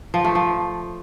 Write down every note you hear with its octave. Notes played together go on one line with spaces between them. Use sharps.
F3
A3
F3